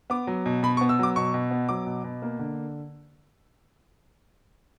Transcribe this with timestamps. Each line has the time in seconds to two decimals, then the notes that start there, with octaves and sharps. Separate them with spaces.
0.10 B3 D6
0.27 F#3
0.46 B2
0.63 B2 B5
0.77 C#6
0.81 B3
0.89 E6
0.99 F#3 D6
1.16 B2 C#6
1.34 B2
1.51 B3
1.69 F#3 D6
1.86 B2
2.04 B2
2.22 A#3
2.39 D3